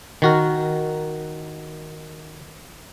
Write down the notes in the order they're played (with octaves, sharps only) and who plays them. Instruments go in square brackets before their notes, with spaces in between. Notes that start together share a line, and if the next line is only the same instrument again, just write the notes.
[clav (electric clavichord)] D#3 F#4 A#4